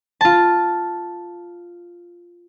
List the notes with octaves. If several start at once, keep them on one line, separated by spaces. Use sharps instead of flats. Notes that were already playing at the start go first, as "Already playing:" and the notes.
F4 A5